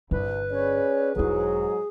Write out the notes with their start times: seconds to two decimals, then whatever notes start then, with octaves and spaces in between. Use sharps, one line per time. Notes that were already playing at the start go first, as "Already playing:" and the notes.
0.11 G1 C2 E4 B4
0.51 C#4 G#4 C#5 D5
1.16 E1 G#2 F#3 E4 G#4